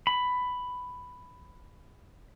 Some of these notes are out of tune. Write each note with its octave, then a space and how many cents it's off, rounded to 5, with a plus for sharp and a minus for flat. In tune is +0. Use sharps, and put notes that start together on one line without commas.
B5 +10